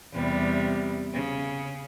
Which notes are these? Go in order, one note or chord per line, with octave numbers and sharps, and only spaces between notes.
E2 C3 G3
C#3